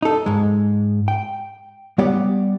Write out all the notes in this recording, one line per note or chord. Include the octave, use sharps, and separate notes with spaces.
D#4 A4
G#2 G#3
G5
G3 B3 G4 C#5 D5 F#5